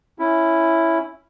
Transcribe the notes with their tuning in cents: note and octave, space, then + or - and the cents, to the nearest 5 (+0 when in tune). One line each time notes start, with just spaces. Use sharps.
C#4 +0 E4 +0